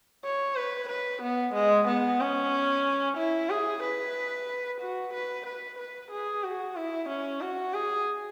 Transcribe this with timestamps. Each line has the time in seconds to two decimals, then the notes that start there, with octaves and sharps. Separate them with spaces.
0.25 C#5
0.56 B4
0.89 B4
1.22 B3
1.54 G#3
1.88 B3
2.20 C#4
3.17 E4
3.50 G#4
3.83 B4
4.81 F#4
5.14 B4
5.46 B4
5.79 B4
6.12 G#4
6.44 F#4
6.76 E4
7.09 C#4
7.41 F#4
7.74 G#4